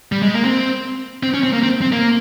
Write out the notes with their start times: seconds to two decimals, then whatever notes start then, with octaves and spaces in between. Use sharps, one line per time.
0.12 G3
0.22 G#3
0.34 A#3
0.45 C4
1.23 C4
1.34 C#4
1.43 C4
1.53 A#3
1.63 C4
1.82 C4
1.92 A#3